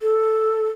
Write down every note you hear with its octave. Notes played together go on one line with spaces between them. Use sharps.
A4